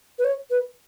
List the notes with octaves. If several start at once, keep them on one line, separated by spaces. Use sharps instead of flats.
B4
C#5
B4